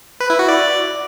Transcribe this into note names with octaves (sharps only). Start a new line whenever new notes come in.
B4
E4
F#4
D5